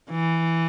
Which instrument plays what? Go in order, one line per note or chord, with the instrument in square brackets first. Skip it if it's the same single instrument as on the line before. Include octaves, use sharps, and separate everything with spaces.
[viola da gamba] E3